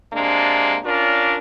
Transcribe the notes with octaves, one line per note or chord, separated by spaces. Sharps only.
C3 G#3 A#3 D4
C#4 D4 F4 A#4 D5